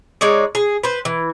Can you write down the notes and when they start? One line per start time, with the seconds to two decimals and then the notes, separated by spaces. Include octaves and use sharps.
0.21 G#3 D#4 C#5 D5
0.55 G#4
0.83 B4 C5
1.05 E3